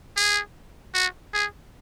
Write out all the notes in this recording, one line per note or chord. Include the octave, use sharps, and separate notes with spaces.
G#4
F#4
G#4